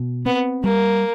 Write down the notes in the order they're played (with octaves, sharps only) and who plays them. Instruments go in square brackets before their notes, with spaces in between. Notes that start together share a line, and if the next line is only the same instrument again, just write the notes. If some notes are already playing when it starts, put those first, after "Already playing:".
Already playing: [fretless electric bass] B2
[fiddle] B3 [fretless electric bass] C4
[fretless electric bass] G3 [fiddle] A#3